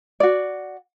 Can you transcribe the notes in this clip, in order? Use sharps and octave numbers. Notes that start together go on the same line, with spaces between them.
F#4 D5